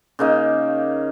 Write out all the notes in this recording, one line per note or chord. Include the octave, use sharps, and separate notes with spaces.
C#3 A#3 D#4